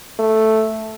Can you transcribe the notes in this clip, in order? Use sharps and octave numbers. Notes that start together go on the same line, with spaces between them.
A3